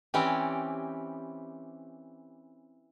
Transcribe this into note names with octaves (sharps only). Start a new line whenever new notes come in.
E3 C4 C#4 G4 D5